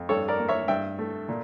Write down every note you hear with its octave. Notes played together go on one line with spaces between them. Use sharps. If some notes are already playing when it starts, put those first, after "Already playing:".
Already playing: F2
G2 A4 C#5
A#4 D5
A#3
C#5 E5
G2 E5 G5
A3
A#2